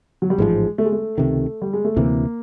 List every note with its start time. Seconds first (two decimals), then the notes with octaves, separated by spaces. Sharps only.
0.22 F#3
0.30 G3
0.38 A1 G#2 F3 G#3
0.78 A3
0.85 G#3
0.92 A3
1.18 C#2 C3 D#3
1.62 G3
1.73 G#3
1.84 A3
1.96 D2 C3 E3 A#3